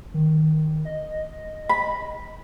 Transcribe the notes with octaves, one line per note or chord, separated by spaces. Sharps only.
D#3
D#5
B5